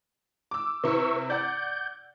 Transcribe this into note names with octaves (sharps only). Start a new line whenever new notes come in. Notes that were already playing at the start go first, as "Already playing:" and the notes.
D6 E6
C3 E4 B4 C#6 E6
D5 F#5 G6